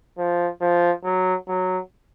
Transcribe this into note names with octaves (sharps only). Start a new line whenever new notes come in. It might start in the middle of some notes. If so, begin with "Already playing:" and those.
F3
F3
F#3
F#3